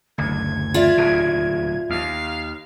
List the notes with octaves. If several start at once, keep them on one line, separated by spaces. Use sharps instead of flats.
F#1 D2 G#6
F4 D5 E5
D1 D#2 B2
D#2 F5